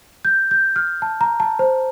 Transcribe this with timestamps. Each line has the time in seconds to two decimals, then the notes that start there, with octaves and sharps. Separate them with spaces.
0.25 G6
0.51 G6
0.76 F6
1.02 A5
1.21 A#5
1.40 A5
1.59 C5